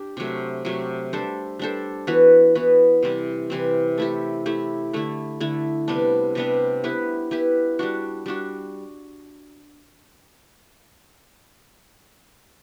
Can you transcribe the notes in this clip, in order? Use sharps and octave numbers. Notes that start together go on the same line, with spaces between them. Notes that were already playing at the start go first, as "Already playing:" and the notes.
Already playing: D4 G4
C3 F#3 A3
C3 F#3 A3
G3 D4 A4 C5
G3 D4 A4 C5
E3 B3 F#4 B4
E3 B3 F#4 B4
C3 E3 G3 C4
C3 E3 G3 C4
A3 E4 G4
A3 E4 G4
D3 A3 E4
D3 A3 E4
C3 G3 B3 D4
C3 G3 B3 D4
B3 E4 G4 B4
B3 E4 G4 B4
G3 D4 F#4
G3 D4 F#4